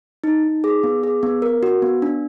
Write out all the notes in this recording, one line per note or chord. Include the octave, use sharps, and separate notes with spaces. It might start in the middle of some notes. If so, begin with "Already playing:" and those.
D#4
D#4
G#4
B3
G#4
B3
A#4
F#4
B3
D4